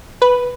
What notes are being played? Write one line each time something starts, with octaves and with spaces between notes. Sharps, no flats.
B4